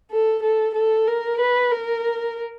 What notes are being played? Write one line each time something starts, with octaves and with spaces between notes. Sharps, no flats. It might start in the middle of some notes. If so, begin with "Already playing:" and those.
A4
A4
A4
A#4
B4
A#4